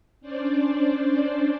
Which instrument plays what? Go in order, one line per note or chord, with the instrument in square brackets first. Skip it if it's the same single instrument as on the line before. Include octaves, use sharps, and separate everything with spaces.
[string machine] C#4 D4 C5 D5